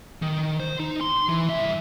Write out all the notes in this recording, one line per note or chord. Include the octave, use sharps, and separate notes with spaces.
D#3
C5
D#4
C6
E3
G2 E5